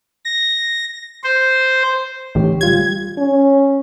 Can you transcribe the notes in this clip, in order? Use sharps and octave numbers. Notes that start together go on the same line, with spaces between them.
A#6
C5
A1 D3 G4 C#5
G3 F4 G4 G#6
C#4